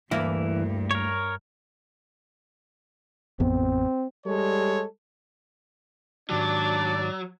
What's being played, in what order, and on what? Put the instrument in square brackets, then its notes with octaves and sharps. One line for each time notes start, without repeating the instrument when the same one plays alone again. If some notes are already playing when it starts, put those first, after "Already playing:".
[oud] D2 A#3 E4 [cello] G2 [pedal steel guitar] E3
[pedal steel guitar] A#4 C#5
[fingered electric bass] A1 F2 B3 [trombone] C4
[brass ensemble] G3 G#3 A4 C#5
[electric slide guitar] G#2 D#3 G4 [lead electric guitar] F#3 [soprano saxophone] D4 [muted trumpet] D5